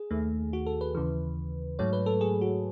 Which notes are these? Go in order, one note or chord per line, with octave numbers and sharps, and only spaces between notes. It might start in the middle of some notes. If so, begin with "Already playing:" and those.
Already playing: G#4
D#2 D#3 A3
F#4
A4
B4
D#2 C#3 E3
G#2 F#3 A3 C#5
B4
A4
G#4
F#4